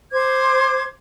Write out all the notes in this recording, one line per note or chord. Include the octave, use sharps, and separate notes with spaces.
C5 D6 G#6